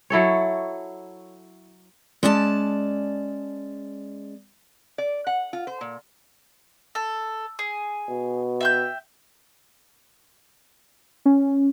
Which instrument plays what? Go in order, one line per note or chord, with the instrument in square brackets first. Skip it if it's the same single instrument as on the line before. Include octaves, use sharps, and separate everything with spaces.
[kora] F#3 E4 A4 C#5
[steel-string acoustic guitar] G#3 C#4 D5 A5
[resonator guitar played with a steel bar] D5
F#5
F4
C5
A#2
[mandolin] A4
G#4
[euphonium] B2
[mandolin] E5 G5 G6
[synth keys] C#4